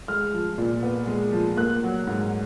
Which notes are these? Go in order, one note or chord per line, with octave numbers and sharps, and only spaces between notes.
G#3 F6
F3
A#2
B3
G#3
F3
A#3 F#6
F#3
G#2